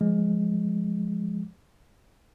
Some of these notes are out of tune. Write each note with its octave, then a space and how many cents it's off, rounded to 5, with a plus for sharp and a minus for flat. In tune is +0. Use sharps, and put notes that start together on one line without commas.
F3 +0 G#3 +0